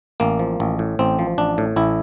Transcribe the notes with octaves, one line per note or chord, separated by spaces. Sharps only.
A1 A#3
F3
A1
A2
A1 C4
F3
A1 D4
A2
A1 E4